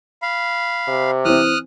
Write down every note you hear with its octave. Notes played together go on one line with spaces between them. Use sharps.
F5 B5
C3
E3 C4 D#6 F6 F#6